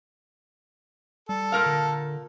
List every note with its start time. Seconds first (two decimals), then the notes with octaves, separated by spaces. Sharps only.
1.29 G3 A4
1.52 A#2 A#4 F5
1.66 D3